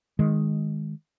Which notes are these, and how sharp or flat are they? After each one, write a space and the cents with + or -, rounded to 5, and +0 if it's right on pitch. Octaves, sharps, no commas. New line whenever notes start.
D#3 +0 G#3 +5